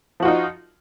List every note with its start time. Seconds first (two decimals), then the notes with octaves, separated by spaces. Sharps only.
0.20 F3
0.22 F#4
0.25 F4
0.28 D#4